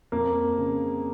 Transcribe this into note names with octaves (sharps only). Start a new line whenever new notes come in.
F2 A#3
C#3